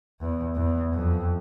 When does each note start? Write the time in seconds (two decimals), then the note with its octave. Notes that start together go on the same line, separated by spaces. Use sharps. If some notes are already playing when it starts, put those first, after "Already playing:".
0.21 E2
0.56 E2
0.93 F2